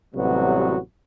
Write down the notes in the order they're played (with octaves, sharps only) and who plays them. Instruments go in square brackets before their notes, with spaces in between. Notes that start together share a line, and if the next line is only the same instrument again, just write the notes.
[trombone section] A1 C3 F#3 G3 B3 F#4